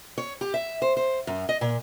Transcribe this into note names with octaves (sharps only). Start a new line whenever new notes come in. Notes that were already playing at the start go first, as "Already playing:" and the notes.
C#5
G4
E5
C5
C5
F#2
D#5
A#2